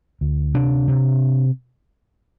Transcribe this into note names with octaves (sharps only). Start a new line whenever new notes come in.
D2
C3 D4
C3